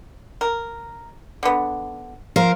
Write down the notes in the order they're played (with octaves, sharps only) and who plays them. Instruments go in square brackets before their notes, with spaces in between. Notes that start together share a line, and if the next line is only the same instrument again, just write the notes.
[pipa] A#4
D3 B3
[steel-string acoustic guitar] F3 A#4 C5